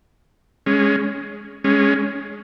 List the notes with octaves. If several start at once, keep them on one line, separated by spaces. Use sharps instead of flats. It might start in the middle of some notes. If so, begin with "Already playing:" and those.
G#3 C#4
G#3 C#4